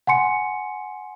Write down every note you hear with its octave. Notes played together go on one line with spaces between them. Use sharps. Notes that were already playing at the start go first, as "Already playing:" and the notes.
F#5 G#5 C6 C#7